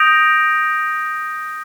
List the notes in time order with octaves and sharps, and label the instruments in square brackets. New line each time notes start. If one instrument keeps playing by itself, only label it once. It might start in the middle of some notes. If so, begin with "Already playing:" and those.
Already playing: [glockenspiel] D#6 G6 A#6 D7 F7